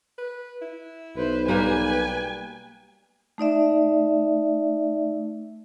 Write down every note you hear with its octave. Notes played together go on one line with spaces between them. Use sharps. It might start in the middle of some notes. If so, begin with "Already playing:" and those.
B4
E4
B1 B4 C5
G3 A#3 G4 B4 G#5
A3 D#4 D5 E5